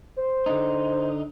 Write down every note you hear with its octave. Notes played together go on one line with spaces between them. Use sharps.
C5
D3 D#4